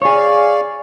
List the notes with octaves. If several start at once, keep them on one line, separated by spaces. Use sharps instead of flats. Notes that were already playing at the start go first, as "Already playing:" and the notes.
G#4 C#5 D5 F5